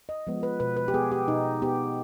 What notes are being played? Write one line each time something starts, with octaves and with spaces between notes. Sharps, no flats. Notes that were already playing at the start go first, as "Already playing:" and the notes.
D#5
F3 G#3 B3
B4
B2 B4
B4
G4
B3 G#4
G4
B2 D#4
B3 G4